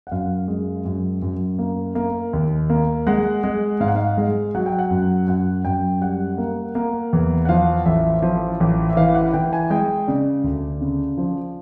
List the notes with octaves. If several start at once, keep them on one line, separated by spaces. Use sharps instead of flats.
F#5
F#2 F5
G#3
F#2
F#2
A#3
A#3
D#2
A#3
G#3 F#5
G#3
G#2 F5
F#5
F5
G#3
F#3 F#5
G5
F#5
F#2
F#2 F#5
F#2 G5
G3 F#5
A#3
A#3
E2
F#5
F3 F5
A1 E5
F3
A1
E5
E3 F5
F#5
E3 G5
G#5
G#3 G5
C#3 D5
D2
C#3
F3